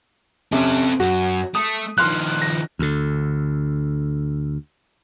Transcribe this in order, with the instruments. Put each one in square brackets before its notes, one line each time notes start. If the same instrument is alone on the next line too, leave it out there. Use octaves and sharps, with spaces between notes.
[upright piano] C3 C#4 [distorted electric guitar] C4 A4
[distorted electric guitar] F#2 [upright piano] F#4
[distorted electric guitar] A3 [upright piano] D#6
[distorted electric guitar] D#3 F3 [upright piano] C6 F6 F#6
[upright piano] A#6
[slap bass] D2 D3